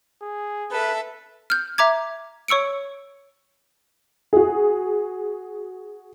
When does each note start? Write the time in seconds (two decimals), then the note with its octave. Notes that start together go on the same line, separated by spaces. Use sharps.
0.22 G#4
0.71 A4 B4 E5
1.50 F6 G6
1.78 E5 A#5 D6 G#6
2.48 C#5 C#6 E6 C#7 D7
4.33 F#4 G#4